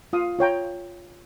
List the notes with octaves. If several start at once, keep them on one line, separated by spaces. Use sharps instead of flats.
F4 F5 D#6
F4 C#5 G5 A#5